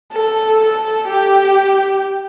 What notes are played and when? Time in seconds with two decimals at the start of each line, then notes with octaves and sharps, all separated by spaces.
0.13 A4
0.60 A4
1.09 G4